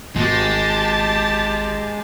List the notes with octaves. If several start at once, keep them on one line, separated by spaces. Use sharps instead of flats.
G#1 G#3 G4 A5